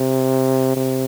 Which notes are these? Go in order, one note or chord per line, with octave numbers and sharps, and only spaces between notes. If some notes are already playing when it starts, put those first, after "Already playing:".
Already playing: C3
C3